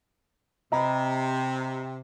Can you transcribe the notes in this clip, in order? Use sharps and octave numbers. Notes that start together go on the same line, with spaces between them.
C3 D#5 A#5 B5